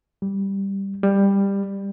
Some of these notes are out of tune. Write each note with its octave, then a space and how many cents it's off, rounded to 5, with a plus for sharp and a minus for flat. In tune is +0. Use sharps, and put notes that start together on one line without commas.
G3 +0
G3 +15